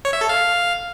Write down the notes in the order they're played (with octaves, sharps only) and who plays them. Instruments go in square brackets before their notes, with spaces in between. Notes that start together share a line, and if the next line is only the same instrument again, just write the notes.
[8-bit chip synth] C#5
E5
A4
F5